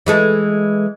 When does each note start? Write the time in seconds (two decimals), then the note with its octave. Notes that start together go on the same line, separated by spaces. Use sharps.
0.06 E3 G#3 A3